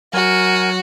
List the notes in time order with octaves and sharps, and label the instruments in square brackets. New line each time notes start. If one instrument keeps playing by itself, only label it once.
[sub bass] F#3 [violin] F#4 [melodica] A#4 G#5